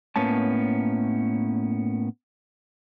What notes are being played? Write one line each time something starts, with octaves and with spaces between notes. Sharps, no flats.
A2 A#3 B3 C#4 A5